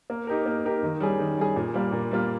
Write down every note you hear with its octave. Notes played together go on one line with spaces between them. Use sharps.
A#3
D#4 G4 A#4
A#3
D#4 G4 A#4
D#3
G3 C#4 G#4
D#3
G3 C#4 G#4
A#2
G3 A#3 F4
A#2
G3 A#3 F4